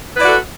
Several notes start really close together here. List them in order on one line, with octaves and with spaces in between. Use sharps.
B4 E4 D5 F#4 A4